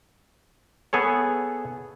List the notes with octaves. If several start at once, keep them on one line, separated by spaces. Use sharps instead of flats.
B3 G#4 A4 C#5